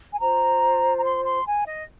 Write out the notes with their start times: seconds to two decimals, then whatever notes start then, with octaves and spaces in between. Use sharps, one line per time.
0.13 G#5
0.20 F4 C5 A#5
0.98 A#5
1.04 C6
1.24 C6
1.45 G#5
1.66 D#5